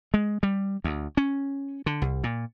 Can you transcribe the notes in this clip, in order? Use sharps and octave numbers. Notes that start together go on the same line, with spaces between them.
G#3
G3
D2
C#4
D3
C2
A#2